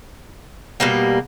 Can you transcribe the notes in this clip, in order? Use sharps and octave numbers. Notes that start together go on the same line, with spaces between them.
B2 G3 A#3